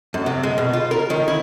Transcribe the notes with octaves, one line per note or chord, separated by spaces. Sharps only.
F#2
C3
G#3
B2
F4
A#4
D#3
E4